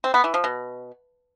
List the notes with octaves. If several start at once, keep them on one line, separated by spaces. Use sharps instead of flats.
C4
B3
E3
F3
B2